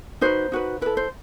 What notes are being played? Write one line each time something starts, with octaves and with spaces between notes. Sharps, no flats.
D#4 F#4 B4 C5
D#4 F#4 B4
E4 A4 B4
C5